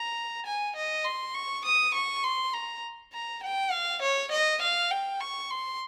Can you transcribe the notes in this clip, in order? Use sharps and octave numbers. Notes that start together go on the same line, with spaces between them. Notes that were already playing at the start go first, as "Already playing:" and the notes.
Already playing: A#5
G#5
D#5
C6
C#6
D#6
C#6
C6
A#5
A#5
G5
F5
C#5
D#5
F5
G5
C#6
C6